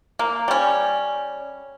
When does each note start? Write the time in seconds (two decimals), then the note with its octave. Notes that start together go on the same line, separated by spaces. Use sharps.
0.19 A#3
0.48 G3 C#4